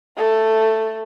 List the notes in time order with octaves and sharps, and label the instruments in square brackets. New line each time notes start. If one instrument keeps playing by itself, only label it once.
[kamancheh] A3 A4